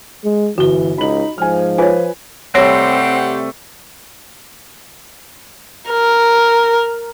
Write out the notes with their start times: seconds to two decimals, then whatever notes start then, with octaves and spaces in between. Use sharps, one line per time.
0.24 G#3
0.58 G1 E3 F#4 G7
0.98 C#2 D#4 B5 F#7
1.38 G#2 F3 G#5 F6
1.78 F4 B4 C#5 G#5
2.55 C3 G3 A3 C4 G4 C5 C#5 F#5
5.90 A#4